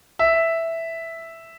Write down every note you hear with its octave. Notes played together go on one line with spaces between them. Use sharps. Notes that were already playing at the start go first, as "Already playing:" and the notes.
E5